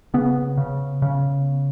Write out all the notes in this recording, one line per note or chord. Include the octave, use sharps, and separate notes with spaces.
C#3 B3
C#3
C#3